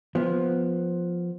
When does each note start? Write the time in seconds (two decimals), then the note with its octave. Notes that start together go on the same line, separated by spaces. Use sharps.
0.15 F3 B3